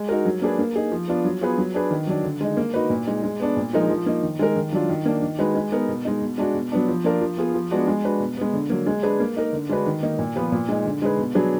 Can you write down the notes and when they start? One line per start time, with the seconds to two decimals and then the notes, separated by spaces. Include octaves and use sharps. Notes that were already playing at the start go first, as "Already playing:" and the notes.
Already playing: G#3
0.09 D#4 F#4 A#4
0.25 F#3
0.42 A#3 D4 G#4 B4
0.59 A#3
0.76 D#4 G#4
0.92 F3
1.08 B3 D4 F4
1.25 F#3
1.41 B3 F4 G#4 B4
1.58 F#3
1.74 D4 G#4 B4
1.91 D#3
2.07 F#3 D4
2.24 D3
2.41 G#3 D#4
2.57 A#3
2.74 D#4 F#4 B4
2.90 A#2
3.07 G#3 D#4
3.23 G#3
3.40 B3 D4
3.57 A#2
3.73 F3 G#3 D#4 A#4
3.90 F3
4.06 A#3 D#4
4.23 D#3
4.39 G#3 D#4 A#4
4.56 D#3
4.73 F#3 D4 F4
4.89 D#3
5.06 A#3 D4
5.22 D#3
5.39 G#3 D#4 F#4 B4
5.55 G#3
5.72 B3 D#4 A#4
5.89 B2
6.05 G#3 D#4
6.22 B2
6.38 G#3 D4 F#4
6.54 B2
6.72 F#3 B3 D4
6.88 F3
7.04 A#3 D4 F4 A#4
7.21 F3
7.37 B3 F4 G#4
7.54 F3
7.71 G#3 B3 D4 F#4
7.87 G#3
8.04 D4 F#4 B4
8.20 B2
8.37 G#3 B3
8.53 D3
8.70 F#3 A#3
8.87 G#3
9.03 D4 G#4 B4
9.20 A#3
9.36 D#4 A#4
9.53 D3
9.69 G#3 D4 F#4 B4
9.86 D#3
10.03 A#3 D#4
10.19 A#2
10.36 F3 B3 F4 B4
10.52 A#2
10.69 G#3 D#4
10.86 D3
11.02 G#3 D#4 G#4 B4
11.18 B2
11.35 F#3 D4 G#4 B4